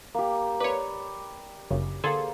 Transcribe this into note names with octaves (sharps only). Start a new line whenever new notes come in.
A#3 G4
B4 C#5 D5 B5
G1 F#2 C#3
D3 A#3 G#4 A4 C5